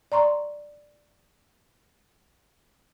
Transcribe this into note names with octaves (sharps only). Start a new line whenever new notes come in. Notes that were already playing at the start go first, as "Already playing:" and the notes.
D5 A#5 C6 C#6